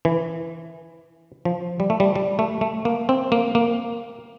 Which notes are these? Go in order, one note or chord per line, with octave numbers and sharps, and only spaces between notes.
E3
F3
G3
A3
G3
G3
A3
A3
A#3
C4
A#3
A#3